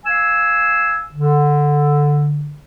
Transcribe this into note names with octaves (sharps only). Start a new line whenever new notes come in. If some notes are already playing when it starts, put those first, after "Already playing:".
F5 G#5 E6
D3